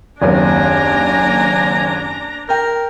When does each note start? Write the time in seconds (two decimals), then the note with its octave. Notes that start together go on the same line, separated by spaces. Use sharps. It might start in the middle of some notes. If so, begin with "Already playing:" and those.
0.22 F#1 D#2 C4 D4 G#5 A#5
2.49 A#4 G5 G6